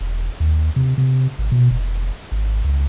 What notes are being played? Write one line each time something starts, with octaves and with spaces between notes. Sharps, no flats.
E1
D#2
C3
C3
G#1
B2
F1
G#1
C#2